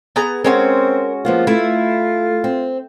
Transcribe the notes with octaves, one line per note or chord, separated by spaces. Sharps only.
B3 G#4 A#5
G#3 C4 C#4 F#4 A#4
F3 A#3 B3 F4
A3 E4
C4